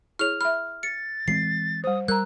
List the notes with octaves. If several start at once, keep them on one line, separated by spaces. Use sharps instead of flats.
E4 G#4 C#5 F6 F7
E5 B5 F6
A6 C#7
E3 G#3 C4 C7
G3 C5 D#6
G3 A#4 A#5 E6 F#6